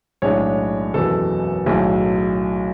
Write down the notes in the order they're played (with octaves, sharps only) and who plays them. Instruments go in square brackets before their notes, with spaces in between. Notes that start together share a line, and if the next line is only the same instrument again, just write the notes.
[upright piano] B1 A2 G#3 D4 C#5
F#1 E2 B2 A4
B1 A2 F#3 A3 G#4